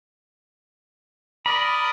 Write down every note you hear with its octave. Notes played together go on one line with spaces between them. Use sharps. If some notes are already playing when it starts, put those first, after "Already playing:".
A#4 D5 D#5 B5